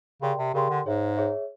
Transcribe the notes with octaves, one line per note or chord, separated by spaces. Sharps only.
C#3 G4 A#4 D5 G5 C6
C3
C#3 G4 A#4 D5 G5 C6
D3
G#2 G#4 C#5 E5
G#4 C#5 E5